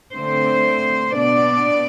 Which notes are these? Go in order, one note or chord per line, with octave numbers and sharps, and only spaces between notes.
D3 A3 C4 C5
B2 B3 D4 D5